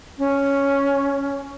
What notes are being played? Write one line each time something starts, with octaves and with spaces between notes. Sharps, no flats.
C#4